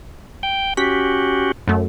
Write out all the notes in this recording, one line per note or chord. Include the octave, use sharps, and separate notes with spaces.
G5
C#4 F#4 G4 B6
F#2 A3